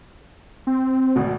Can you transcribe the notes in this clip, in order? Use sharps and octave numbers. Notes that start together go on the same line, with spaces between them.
C4
G#1 D2 B2